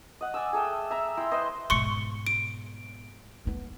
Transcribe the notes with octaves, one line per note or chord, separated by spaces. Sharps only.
D#5 F#5
D5 G#5 D#6 E6
G#4 A4 E5 G5
E5 A#5 E6
E4 G5 B5 C6
B4 C5 D#5 C6
G#2 B2 C6 C#6 C#7
D7
A#3 B3